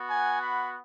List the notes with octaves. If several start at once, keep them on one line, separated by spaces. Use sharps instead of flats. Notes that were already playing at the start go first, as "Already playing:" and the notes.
Already playing: B3 F#4
G#5
B5